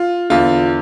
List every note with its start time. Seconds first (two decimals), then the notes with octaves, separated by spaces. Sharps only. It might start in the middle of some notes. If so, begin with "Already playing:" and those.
Already playing: F4
0.30 E2 D3 F4